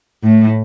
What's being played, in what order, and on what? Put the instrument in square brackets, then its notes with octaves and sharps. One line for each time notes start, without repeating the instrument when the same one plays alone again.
[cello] A2